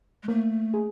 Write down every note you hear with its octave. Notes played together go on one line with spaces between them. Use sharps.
G#3
A3 A#3
G#4